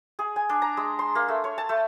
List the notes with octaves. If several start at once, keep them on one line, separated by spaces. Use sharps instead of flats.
G#4
G#5
D4
A#5
G#3
C6
A#3
A3
C#5
A5
A3